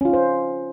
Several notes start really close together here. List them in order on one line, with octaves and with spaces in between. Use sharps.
C#4 F4 D#4 C5